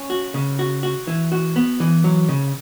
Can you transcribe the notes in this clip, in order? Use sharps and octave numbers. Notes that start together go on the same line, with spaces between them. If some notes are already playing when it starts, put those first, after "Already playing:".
Already playing: C#4
F#4
C#3
F#4
F#4
E3
F#4
B3
E3
F#3
C#3